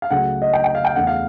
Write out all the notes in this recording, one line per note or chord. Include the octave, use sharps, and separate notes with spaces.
F5
C#2 C#3 F#3 A3 F#5
D#5
G5
G5
F5
G5
E2 C#3 E3 A3 F#5
F5